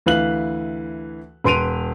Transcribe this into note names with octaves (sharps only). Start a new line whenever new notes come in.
D2 E3 B4 F5 F#6 F#7
E1 B4 C6 D7 D#7 F7